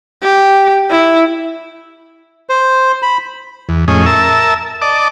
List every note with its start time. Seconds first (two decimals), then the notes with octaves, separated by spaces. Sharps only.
0.22 G4
0.91 E4
2.49 C5
3.03 B5
3.69 E2
3.88 F2 A2 C#4 G#4 D#5
4.06 A#4 E5 A5 E6
4.82 D5 D#5 A5 D6